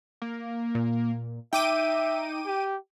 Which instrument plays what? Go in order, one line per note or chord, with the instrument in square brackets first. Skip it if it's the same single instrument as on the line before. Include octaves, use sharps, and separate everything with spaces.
[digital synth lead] A#3
[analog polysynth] A#2
[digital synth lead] D#4 [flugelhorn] E5 [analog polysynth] G5 D6 D#7
[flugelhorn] G4